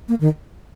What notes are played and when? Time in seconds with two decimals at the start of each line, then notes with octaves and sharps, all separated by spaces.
0.08 A#3
0.21 D#3